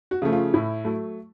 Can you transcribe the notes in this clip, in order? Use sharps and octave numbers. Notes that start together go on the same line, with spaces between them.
F#4
C#3 F3 A3
F4
A2 E4
F#3 A3